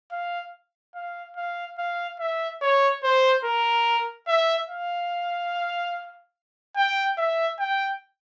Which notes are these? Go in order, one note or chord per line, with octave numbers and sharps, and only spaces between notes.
F5
F5
F5
F5
E5
C#5
C5
A#4
E5
F5
G5
E5
G5